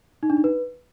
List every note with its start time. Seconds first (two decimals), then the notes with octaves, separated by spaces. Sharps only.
0.23 D#4
0.30 D4
0.37 D#4
0.44 B4